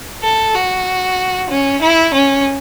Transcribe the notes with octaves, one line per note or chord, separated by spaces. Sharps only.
A4
F#4
C#4
E4
C#4